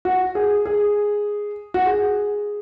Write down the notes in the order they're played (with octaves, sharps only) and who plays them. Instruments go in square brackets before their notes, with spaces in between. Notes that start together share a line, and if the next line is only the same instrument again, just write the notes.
[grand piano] F#4
G#4
G#4
F#4
G#4